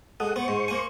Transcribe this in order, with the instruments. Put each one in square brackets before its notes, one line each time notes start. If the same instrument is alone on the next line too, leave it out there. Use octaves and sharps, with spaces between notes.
[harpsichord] G#3 [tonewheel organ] A4 F#5 D#6
[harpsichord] B3 [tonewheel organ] C5 C#6
[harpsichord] G#2
A#3 G#5